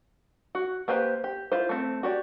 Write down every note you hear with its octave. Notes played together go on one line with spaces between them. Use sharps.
F#4
A#3 G4 B4 C5
G4
E4 F4 C5
A3 C4
F#4 G4 D5